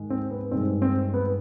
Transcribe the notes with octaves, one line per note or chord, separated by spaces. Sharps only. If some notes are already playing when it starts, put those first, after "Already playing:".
Already playing: G#2 D#3 G#3
C4
B3
G2 D#3 G#3 C4
C4
B3